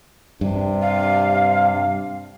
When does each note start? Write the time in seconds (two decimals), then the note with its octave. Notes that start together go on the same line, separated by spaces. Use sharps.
0.41 G2 C3 D4
0.82 F5